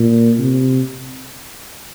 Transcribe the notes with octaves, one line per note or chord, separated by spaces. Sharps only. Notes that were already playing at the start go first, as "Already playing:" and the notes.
Already playing: A#2
C3